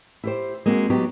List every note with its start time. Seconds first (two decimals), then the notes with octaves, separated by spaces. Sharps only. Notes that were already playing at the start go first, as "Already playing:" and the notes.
0.24 E4 G4 C5
0.66 G#3 A#3 C4 F#4
0.90 F#3 B3 D#4 G4